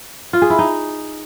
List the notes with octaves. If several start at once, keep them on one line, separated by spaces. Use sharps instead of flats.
F4
G#4
E4
D#4